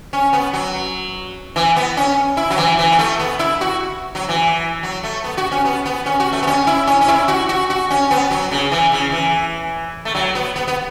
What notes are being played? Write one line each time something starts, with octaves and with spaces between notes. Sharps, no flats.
C#4
B3
F#3
E3
B3
C#4
E4
F#3
E3
E3
B3
A3
B3
E4
F#4
F#3
E3
F#3
A3
B3
F#4
C#4
B3
B3
C#4
F#4
A3
B3
C#4
E4
C#4
C#4
E4
F#4
F#4
F#4
C#4
B3
F#3
C#3
E3
C#3
E3
A3
F#3
B3
B3
B3